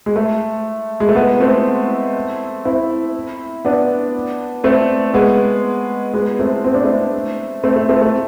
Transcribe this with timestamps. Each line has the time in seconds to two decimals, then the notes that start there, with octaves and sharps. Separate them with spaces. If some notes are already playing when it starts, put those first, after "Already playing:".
0.06 G#3
0.16 A3
1.00 G#3
1.09 A3
1.15 G#3 B3
1.40 A3 C4
2.65 C4 E4
3.65 B3 D4
4.64 A3 C4
5.14 G#3 B3
6.14 G#3 B3
6.39 A3 C4
6.64 C4
6.74 D4
6.84 A3 C4
7.63 A3 C4
7.76 A3
7.89 A3 C4
8.01 A3